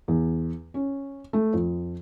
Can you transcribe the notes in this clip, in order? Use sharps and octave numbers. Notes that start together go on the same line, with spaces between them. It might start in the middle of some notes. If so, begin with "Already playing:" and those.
E2
C#4
A3
F2